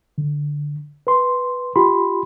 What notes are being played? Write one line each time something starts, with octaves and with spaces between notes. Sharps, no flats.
D3
B4 C6
F4 G4 B5 C6